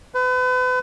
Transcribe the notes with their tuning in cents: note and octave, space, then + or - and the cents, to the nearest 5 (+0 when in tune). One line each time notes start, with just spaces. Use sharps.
B4 +35